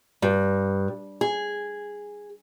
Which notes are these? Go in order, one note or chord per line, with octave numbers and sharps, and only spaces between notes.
G2
G#4